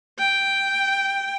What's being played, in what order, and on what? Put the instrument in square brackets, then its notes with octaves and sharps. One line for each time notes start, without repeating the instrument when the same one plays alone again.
[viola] G5